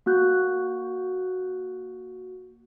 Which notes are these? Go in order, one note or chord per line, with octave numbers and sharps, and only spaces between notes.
A#3 F#4 F#6 G6